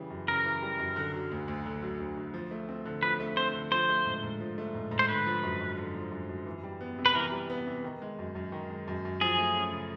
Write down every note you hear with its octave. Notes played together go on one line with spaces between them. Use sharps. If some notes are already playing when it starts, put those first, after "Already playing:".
Already playing: C#3 E3 G3
F#2
C#3 A#4
E3
G3
F#2
D3
F#3
D2
D2
D3
F#3
D2
D2
F3
A3
C4
D3
F3 B4
A3
C4 C5
D3
F3 C5
A3
G#2
G#2
F3
A3
G#2
G#2
C5
D3 B4
F3
F#2
F#2
D3
F3
F#2
F#2
E3
G3
B3
C3
B4
E3 A#4
G3
B3
C3
D#3
G#3
F#2
F#2
D#3
G#3
F#2
F#2
F3 G#4
A3
C#4
C#3